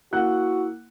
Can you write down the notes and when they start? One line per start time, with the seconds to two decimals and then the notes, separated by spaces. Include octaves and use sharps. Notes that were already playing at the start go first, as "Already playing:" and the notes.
0.13 A#3 E4 F#4 F#5 F#6